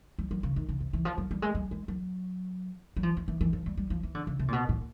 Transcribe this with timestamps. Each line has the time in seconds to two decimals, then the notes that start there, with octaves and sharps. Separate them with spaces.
0.19 G3
0.31 F#3
0.43 C#3
0.56 D#3
0.69 C#3
0.80 C3
0.93 E3
1.05 F3
1.18 F#3
1.31 G3
1.42 G#3
1.55 G3
1.71 G#3
1.88 F#3
2.97 F#3
3.03 F3
3.17 F3
3.28 E3
3.41 E3
3.53 F3
3.66 G3
3.77 G3
3.90 F3
4.03 E3
4.15 D3
4.27 C#3
4.39 C3
4.48 A#2
4.53 B2
4.69 A#2